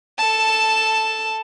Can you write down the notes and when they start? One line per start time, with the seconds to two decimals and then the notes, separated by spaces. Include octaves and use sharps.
0.18 A4 A5